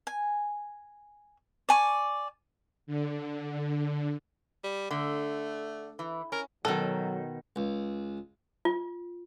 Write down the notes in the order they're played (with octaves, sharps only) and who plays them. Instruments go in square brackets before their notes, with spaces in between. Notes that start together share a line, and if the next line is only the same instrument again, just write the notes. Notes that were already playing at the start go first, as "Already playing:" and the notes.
[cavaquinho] G#5
D5 G#5 C#6
[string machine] D3
[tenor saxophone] G3
[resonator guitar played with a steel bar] D3 [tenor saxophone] A3
[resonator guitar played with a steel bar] E3
[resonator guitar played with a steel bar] C#4 [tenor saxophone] A#4
[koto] B2 D#3 [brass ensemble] F#3 [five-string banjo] A4
[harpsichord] C#2
[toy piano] F4